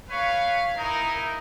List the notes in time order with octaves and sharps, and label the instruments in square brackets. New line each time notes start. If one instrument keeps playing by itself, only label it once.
[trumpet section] B4 C#5 C#6 [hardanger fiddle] F5
[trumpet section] D#4 [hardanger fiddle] E4 A#4